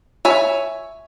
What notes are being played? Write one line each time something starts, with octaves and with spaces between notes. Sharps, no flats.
C#5 E5 G#5